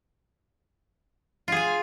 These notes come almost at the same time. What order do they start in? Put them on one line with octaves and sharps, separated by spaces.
F4 G#4 G#5